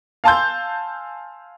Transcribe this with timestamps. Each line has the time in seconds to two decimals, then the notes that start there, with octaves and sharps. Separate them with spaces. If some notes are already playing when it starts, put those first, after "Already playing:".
0.24 F5 G#5 A5 C6 E6 G6